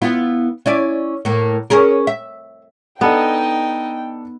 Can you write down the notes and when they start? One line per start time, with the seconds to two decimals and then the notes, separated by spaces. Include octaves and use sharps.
0.02 B3 E4 F4
0.66 C#4 E4 D5
1.25 A2 A#3
1.70 C#4 G#4 A#4
2.07 E5
3.01 B3 D4 D#4 A4 D#5 G5